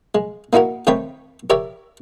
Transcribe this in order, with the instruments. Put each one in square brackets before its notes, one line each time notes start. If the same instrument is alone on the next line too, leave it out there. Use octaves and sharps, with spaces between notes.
[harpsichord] G#3
A#3 D#4 E4 F#4 A#4
D#3 A3 C4 C#5 G5 B5
G4 A#4 C#5 D5 E5